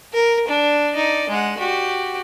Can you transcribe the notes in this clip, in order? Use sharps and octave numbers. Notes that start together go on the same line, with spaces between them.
A#4
D4
D#4 D5
G#3 F#5
F#4 G4